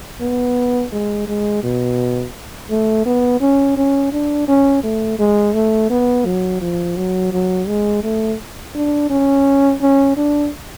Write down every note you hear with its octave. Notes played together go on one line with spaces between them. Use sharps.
B3
G#3
G#3
B2
A3
B3
C#4
C#4
D4
C#4
A3
G#3
A3
B3
F#3
F3
F#3
F#3
G#3
A3
D4
C#4
C#4
D4